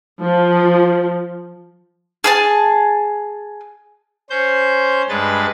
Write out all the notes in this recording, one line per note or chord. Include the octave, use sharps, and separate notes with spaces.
F3
G#4 G#5 A5
C#4 C5 G6
G2 G#3 B4 A6